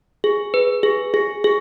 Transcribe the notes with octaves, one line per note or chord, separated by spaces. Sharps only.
G#4
B4
G#4
G#4
G#4